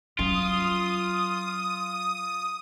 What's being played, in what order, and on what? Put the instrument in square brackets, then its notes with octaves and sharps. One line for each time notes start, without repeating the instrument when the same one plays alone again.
[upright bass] F#3 C#4 [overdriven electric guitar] F4 [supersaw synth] D#6